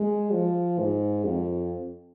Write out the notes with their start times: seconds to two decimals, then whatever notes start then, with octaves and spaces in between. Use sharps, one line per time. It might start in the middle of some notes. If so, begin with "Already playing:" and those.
Already playing: G#3
0.32 F3
0.79 G#2
1.24 F2